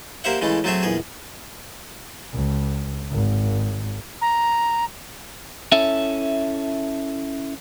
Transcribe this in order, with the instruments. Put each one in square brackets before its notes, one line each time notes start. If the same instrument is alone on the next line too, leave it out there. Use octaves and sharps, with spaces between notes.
[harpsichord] A#3 G4 C5 E5 F#5
C#3 E3 G#3 A3
F#3 A3 C4 G#4 E5
A#1 E2 G#4
[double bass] C#2
G#1
[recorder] A#5
[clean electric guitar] C#4 E4 A4 E5